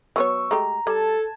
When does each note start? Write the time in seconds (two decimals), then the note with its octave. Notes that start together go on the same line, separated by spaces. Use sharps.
0.16 F#3 B3 C#5 C#6 E6
0.51 G#3 A3 G4 A#5
0.87 G3 A4 A5 G#6